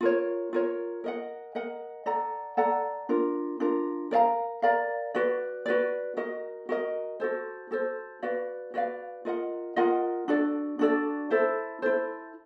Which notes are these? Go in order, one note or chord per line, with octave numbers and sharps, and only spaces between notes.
F4 A#4 C#5
F4 A#4 C#5
A#4 D#5 F#5
A#4 D#5 F#5
A4 D5 F#5 A#5
A4 D5 F#5 A#5
D4 F4 A#4
D4 F4 A#4
A#4 D5 F5 A#5
A#4 D5 F5 A#5
F#4 B4 D5
F#4 B4 D5
F#4 A#4 D#5
F#4 A#4 D#5
F#4 A4 C5
F#4 A4 C5
F#4 B4 D5 F5
F#4 B4 D5 F5
F4 A#4 D#5 F#5
F4 A#4 D#5 F#5
D4 F#4 A4 D5
D4 F#4 A4 D5
E4 A4 C5
E4 A4 C5